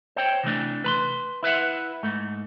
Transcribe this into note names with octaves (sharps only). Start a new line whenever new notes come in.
C5 C#5 G5
C3 E3 A3 D4
B4 B5 C6
E4 B4 E5 F#5
G#2 A3